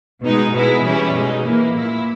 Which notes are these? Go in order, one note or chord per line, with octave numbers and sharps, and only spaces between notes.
B2 G#3 D#4
B2 G#3 B3 E4
E3 G3 C#4 E4
B2 G#3 D#4
E3 A#3 E4
A#2 A#3 E4